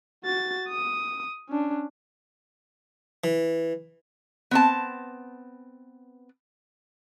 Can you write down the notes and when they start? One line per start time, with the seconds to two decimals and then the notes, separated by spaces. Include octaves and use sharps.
0.24 F#4 A6
0.69 D#6
1.49 C#4 D4
3.24 E3
4.51 B3 C4 A5